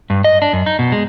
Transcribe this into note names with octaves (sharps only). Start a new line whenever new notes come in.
G2
D#5
D4
F#2
D#4
B2
G#3